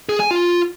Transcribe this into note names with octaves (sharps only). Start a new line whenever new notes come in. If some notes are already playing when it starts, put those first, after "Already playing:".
G#4
G#5
F4